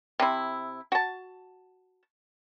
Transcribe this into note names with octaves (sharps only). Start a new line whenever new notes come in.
C3 E4
F#4 A5